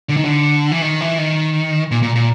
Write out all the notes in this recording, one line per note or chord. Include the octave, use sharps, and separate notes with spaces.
D3
D#3
D3
E3
D#3
E3
D#3
A#2
A#2
A#2